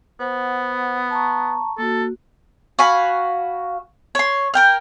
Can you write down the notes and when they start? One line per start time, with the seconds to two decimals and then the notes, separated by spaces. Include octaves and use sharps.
0.20 B3 C5 F#5
1.10 A5 A#5 C#6
1.78 A#3 F#4 A4
2.79 F#4 F5 G#5 B5
4.15 C#5 C6
4.54 A#4 G5 F6